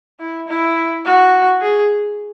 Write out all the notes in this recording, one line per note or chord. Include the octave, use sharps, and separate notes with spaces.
E4
E4
F#4
G#4